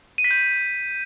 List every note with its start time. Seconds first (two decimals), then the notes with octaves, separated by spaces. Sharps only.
0.18 D#7
0.24 B6
0.31 G6